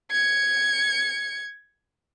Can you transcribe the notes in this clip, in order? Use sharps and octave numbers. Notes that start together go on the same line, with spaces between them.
G#6 C#7